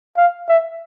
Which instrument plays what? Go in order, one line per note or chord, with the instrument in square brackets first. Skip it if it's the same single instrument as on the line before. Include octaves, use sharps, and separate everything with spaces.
[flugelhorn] F5
E5